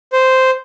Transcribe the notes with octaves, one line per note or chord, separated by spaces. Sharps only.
C5